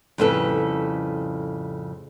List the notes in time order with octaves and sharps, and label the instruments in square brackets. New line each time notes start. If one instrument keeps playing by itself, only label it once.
[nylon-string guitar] F2 A2 C#3 G3 A4 B4